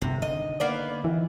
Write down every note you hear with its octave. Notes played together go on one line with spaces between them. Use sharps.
G1 E2 C3
D3 D#3 D#5
A#3 B3 D5
D#3 E3